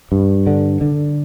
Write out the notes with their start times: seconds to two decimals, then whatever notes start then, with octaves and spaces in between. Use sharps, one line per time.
0.12 G2
0.47 D3
0.81 D3